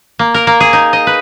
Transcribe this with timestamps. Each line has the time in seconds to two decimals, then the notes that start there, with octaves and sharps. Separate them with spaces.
0.19 A#3
0.34 A#4
0.47 A#3
0.60 G#4
0.73 D#4
0.93 D#5
1.07 B4